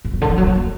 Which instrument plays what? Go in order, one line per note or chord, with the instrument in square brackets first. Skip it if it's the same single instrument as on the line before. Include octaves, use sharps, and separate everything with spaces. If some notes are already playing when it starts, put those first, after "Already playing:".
[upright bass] G#2
B2
D3
F3
F#3
G#3
A#3